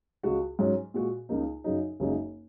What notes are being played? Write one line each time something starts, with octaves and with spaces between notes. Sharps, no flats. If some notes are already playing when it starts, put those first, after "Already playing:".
C#2 C#3 G#3 F#4
G#2 F#3 C#4
A#2 G#3 F#4
C#2 C#3 A#3 D#4
F#2 C#3 F#3 D#4
F#1 F#2 C#3 G#3 D#4